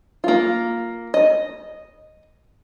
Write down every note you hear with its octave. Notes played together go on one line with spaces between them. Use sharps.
A#3 F4
D#5